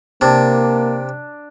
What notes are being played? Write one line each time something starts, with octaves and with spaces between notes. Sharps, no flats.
C3 A#3 D4